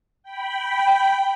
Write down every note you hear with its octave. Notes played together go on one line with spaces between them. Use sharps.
G5 B5